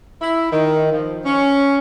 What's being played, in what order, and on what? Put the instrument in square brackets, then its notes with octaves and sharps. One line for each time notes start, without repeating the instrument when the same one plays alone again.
[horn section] E4
D#3
F3
C#4